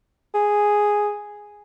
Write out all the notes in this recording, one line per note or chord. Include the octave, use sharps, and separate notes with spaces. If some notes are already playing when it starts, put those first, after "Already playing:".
G#4